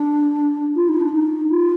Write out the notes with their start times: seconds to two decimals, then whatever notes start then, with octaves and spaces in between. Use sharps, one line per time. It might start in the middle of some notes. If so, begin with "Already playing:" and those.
Already playing: D4
0.75 F4
0.88 D#4
1.00 D4
1.13 D#4
1.50 F4